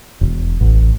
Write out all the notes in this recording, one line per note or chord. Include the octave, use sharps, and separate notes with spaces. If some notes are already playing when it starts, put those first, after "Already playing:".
E1
A1